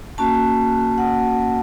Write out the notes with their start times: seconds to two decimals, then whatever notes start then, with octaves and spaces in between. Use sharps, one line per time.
0.18 A#3 C#4 F#4 A5
0.98 F#5